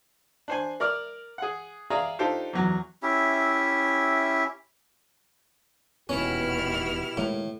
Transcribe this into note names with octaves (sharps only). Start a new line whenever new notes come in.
D4 C5 G#5
A#4 D5 D6 F6
G#4 F#5
G#4 D5 E5 F5 A#5
D4 D#4 F4 G4 A4 C5
E2 F#3
C#4 E4 G4 E5
E1 D#2 B2 B3 C#4 E4 G4 F6
A2 D#3 G#3 A#3